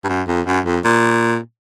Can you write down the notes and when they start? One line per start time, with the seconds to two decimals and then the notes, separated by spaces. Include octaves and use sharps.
0.04 G2
0.09 F#2
0.28 F2
0.46 F#2
0.65 F2
0.84 A#2